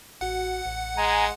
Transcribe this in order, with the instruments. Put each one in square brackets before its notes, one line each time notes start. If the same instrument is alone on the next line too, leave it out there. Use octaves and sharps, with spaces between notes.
[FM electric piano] A1 F#4 [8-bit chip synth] F#5
[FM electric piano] A1
[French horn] G#3 [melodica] G#5 A#5